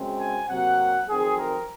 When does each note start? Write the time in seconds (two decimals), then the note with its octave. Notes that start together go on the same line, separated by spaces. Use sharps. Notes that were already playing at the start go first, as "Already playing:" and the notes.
Already playing: F#2 C#3 G#3 C4
0.19 G#5
0.48 C3 F#3 A#3 F#5
1.08 F2 D#3 F#3 C4 G#4
1.38 A#4